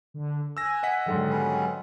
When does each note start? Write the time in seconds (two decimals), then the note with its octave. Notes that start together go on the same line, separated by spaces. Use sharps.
0.14 D3
0.57 G#5 E6 F#6 A#6
0.83 D#5 F#5 B6
1.06 G#2 D3 D#3 F#3
1.30 G3 B3 C#4